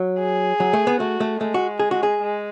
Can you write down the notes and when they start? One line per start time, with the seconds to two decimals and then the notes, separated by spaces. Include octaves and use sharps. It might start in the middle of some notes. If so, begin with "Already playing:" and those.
Already playing: F#3
0.19 G#4
0.60 F#3
0.73 A3
0.87 B3
1.00 A3 F#4
1.20 A3
1.41 G#3 A3
1.54 F#4
1.79 G#4
1.91 F#4
2.03 G#4
2.21 G#3